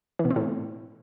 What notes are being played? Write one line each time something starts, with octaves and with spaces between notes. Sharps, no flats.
E3
B2
C4
A2